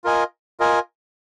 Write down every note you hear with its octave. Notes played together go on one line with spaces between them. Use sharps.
F4 A#4 D#5 G#5
F4 A#4 D#5 G#5